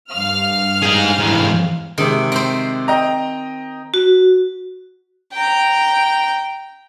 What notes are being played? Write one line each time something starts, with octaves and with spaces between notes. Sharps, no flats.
G2 F5 F6
D#4 G#4
G#2 E3
C3 D#3 G#3
C4 C5
D#5 G5 A#5
F#4
G5 A#5